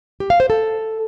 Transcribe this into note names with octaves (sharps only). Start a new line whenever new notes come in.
G4
F5
C5
A4